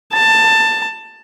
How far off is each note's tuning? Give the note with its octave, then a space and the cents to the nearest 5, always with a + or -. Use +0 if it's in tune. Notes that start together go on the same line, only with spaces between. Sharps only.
A5 +15